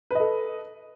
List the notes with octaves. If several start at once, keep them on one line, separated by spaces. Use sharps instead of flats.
A4 B4 D#5